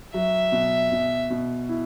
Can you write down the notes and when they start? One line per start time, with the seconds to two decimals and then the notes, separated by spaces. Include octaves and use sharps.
0.14 F#3 E5
0.52 B2
0.92 B2
1.30 B2
1.69 E4